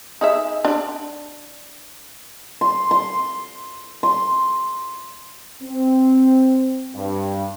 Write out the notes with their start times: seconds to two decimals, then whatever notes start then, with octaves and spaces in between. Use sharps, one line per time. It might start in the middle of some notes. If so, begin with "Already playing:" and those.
0.21 D#4 G#4 E5
0.65 D4 D5
2.61 C6
2.91 C6
4.03 C6
5.63 C4
6.96 G2